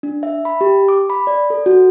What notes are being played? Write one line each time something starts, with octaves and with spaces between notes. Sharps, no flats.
D4
E5
B5
G4
D6
B5
D5
A4
F#4